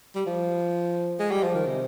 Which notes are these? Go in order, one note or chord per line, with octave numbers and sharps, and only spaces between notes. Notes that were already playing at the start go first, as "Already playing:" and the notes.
G3
F3
G#3
G3
F3
D#3
C3